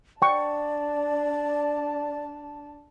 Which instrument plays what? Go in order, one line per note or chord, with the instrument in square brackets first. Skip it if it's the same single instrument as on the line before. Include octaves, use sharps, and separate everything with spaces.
[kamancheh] D4 A5 [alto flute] D5 [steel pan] G5 C#6